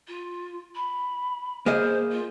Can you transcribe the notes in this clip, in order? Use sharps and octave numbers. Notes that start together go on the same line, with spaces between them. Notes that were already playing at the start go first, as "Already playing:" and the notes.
F4
B5
A#3 G#4 C5 D#5
F4